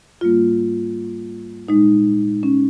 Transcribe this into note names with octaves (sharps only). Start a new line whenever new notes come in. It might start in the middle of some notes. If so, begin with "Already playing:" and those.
G#2 G3 A#3 F4
A#2 G#3 D#4
C#4